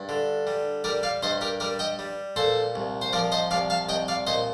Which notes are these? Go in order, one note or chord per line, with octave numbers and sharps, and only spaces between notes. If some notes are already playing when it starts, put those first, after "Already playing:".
Already playing: G2
D3
G3
G3 A#4 D5
D5 F5
G2 C5 D#5
G4 A#4
G3 A#4 D5
D#5 G5
G3
A#2 A4 C5
C2
C5
F3 A#4 D5
C5 D#5
C2 D5 F5
F5 A5
C2 D#5 G5
D5 F5
A#2 C5 D#5